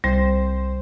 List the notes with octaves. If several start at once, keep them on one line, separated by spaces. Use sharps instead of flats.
C2 G3 C5